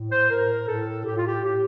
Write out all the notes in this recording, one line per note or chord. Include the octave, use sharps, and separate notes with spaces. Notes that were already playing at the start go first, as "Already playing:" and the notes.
Already playing: A2
C5
A2 A#4
A2 A4
A2 G4
F4
G4
A2 G4